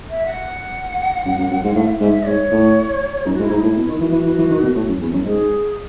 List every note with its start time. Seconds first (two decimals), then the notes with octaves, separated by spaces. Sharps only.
0.10 E5
0.26 F#5
1.26 F#2
1.38 F#2
1.51 F#2
1.64 G#2
1.75 A2 E5
2.01 G#2 E5
2.26 G#2 C#5
2.51 A2
3.25 F#2 D#4
3.35 F#4
3.39 G#2
3.42 E4
3.50 G#2 D#4
3.60 A2 E4
3.76 B2 E4
3.88 D#3
4.01 E3 F#4
4.13 E3
4.26 E3
4.39 E3
4.51 D#3
4.63 B2
4.76 A2
4.89 F#2
5.01 E2
5.13 F#2
5.25 G#2 G#4